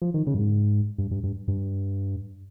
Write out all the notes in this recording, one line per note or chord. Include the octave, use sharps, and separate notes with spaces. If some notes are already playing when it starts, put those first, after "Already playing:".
F3
D#3
C#3
G2
G#2
G2
G2
G2
G2